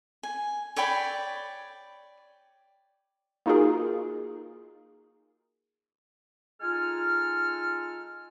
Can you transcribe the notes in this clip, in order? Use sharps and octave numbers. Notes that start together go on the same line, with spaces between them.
G#5
C#5 D5 G5 B5
A#3 D#4 F4 F#4 G#4 A#4
G#3 D#4 F4 A4 G#5 F6